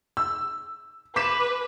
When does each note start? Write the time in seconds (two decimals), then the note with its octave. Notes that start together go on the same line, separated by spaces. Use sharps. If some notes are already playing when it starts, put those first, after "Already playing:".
0.17 E6
1.16 B4 D6 B6 E7